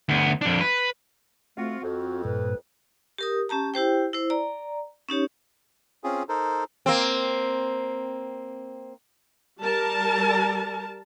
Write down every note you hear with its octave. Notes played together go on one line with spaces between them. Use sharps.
D2 B3
F2 D4
B4
A3 C4 F4 F#4
F2 F#4
G2 A#2 B4
G4 A#4 D#6
C#4 G4 A5 A#5
E4 G4 C5 G5
E4 C5
D5 A#5
C#4 D#4 G4 C#5
C4 C#4 F4 G#4
D#4 A4 A#4 C5
A#3 C4
G3 A#4 A5